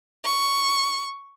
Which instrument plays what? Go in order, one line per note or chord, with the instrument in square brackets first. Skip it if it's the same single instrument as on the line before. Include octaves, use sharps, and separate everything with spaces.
[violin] C#6